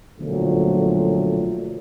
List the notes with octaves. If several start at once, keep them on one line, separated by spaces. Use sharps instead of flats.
B1 A#2 D3 F3 F#3 A3